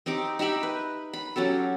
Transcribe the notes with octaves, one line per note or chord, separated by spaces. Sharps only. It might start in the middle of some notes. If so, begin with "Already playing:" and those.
C4 D#4 G4 D6
D#4 G4 E5 B5
B4
B5
F#3 C#4 G4 A4